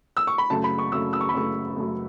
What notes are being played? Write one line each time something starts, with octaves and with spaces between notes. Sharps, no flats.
E6
C#6
B5
F#2 C#3 A3 A5
B5
C#6
F#2 C#3 A3 E6
E6
C#6
B5
F#2 C#3 A3 C#6
F#2 C#3 A3